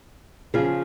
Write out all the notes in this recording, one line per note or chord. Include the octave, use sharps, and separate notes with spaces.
C#3 F3 F4 G#4